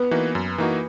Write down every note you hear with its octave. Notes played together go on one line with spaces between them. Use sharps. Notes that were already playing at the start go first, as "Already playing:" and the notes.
Already playing: B3
E3 A#3 D#4 F#4
F#2
E3 A#3 D#4 F#4